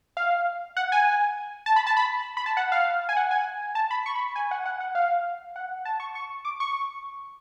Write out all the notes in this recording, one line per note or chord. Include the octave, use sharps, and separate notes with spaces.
F5
F#5
G#5
A5
B5
A5
B5
B5
A5
F#5
F5
G#5
F#5
G#5
A5
B5
C#6
B5
G#5
F#5
F#5
F#5
F5
F#5
A5
C#6
C#6
D6
C#6